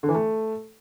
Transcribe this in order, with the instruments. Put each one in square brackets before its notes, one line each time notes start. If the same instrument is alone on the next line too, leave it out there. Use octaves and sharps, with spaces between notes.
[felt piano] D3
E3
A3